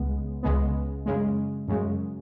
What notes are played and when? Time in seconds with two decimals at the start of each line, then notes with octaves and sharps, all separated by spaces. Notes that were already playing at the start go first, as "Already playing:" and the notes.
Already playing: C#2 C#3 G#3 B3
0.43 C#2 C#3 G#3 B3
1.06 F#2 C#3 G#3
1.68 F#2 C#3 G#3